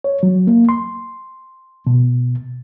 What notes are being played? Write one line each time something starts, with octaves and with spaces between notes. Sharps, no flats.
C#5
F#3
A#3
C6
B2